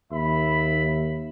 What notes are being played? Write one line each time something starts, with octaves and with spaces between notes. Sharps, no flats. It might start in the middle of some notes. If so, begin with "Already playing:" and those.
D#2 E5 B5